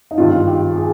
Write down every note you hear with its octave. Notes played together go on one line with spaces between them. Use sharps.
D#4
G#1 G2 D#3 F4
G4
G#4